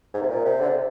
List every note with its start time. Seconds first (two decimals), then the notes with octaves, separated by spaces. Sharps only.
0.14 G#2
0.21 C3
0.29 A#2
0.45 C3
0.61 D3
0.69 C3